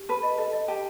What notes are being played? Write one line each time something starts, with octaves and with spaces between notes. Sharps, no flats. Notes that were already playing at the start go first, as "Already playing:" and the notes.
Already playing: G4
B4 A5
D#5
A4 D#5
D#5
G4 A5